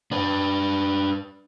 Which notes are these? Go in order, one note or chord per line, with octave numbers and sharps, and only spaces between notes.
D4 B4